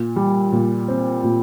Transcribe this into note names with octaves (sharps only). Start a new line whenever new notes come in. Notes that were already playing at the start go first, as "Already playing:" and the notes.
Already playing: A#2
G3
A#2
C4
A#2